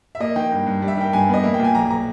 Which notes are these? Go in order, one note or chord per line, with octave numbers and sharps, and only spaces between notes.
E5
A#3 D#5
D#3 G5
G2
G2
G3
E5
D#3 G5
G2 G#5
B3 D#5
A#3 E5
G5
A#2 G#5
B1 A#5
A#5